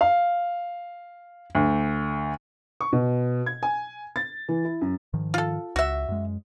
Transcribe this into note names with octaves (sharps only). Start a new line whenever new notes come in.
F5
D2
C#6
B2
G#6
G#5
A6
E3
E4
F#2
G#2 D#3 F3
F4 A4
C#2 F#4 E5
F#2 G#3